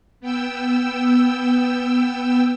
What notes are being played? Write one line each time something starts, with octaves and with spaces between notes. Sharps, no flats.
B3 G5 E6